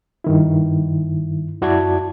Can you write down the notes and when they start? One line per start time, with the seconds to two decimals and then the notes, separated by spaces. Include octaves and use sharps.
0.24 G2 D#3 E4
1.61 F#2 E4 F#4 D5 A5 G#6